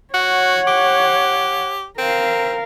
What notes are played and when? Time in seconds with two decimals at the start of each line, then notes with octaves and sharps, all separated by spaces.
0.14 F#4 C#5 F#5
0.67 G4
1.98 C4 A#4 F5